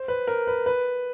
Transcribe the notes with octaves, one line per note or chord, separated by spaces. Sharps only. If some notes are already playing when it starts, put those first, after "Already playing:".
Already playing: C5
B4
A#4
B4
B4